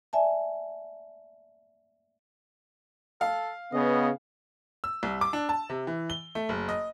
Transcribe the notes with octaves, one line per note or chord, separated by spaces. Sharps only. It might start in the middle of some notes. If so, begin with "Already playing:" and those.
D5 E5 G#5 A5
A4 F5
C#3 B3 D#5
E6
C2
D6
D4
A5
C3
E3
G7
A3
F#1
D#5